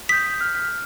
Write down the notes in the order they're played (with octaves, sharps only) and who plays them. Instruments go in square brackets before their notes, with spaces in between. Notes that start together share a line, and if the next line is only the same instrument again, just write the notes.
[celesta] D#6 G6 [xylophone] B6
[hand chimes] F6